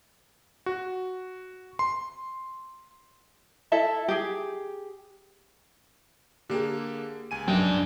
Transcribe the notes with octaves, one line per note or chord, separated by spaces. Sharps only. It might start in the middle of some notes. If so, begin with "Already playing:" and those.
F#4
C6
E4 A4 E5 A5
G4 G#4
D3 A#3 G4 G#4
C#2 G#5 D#7
B1 F#2 D4 G5